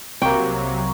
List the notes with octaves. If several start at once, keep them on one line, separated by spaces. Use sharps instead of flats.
C2 C3 F#3 A#3 G5 C#6